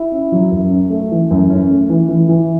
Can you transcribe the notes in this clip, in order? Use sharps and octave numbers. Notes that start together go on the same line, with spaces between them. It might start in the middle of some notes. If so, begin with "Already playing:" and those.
Already playing: E4
C#4
F#3
F#2
C#4
A3
E3
F#2
C#4
A3
E3
E3
E3